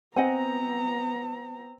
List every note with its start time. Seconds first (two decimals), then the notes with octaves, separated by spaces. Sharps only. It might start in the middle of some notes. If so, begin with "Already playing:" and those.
0.16 B3 C4 D#5 F#5 G#5 A#5